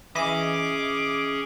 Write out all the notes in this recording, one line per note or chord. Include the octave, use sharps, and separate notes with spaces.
E3 C#4 G#4 D#5 E5 D6